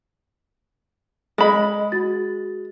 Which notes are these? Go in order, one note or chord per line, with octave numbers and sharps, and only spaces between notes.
G#3 G#4 D#5 B5
F#4 A6